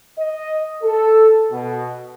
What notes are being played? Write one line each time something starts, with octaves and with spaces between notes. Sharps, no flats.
D#5
A4
B2